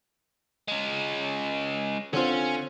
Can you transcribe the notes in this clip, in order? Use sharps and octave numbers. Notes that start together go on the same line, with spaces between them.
G#3 C#4
D3 C4 C#4 F4